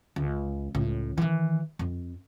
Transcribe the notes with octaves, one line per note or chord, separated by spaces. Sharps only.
C#2
C#2 A2
D#3 E3
F2